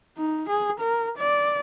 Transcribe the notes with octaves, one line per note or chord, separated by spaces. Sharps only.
D#4
G#4
A#4
D5